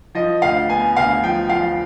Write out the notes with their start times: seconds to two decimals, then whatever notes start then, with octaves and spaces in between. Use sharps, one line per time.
0.15 F3 D#5
0.42 D2 F5
0.70 B3 G#5
0.96 D2 F5
1.23 F3 G5
1.49 F3 F5